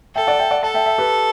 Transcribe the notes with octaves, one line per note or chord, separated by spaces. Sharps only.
A4 E5 G5
D5 F#5
E5 G5
D5 F#5
A4 F#5 A5
E5 G5
E5 G5
G4 B4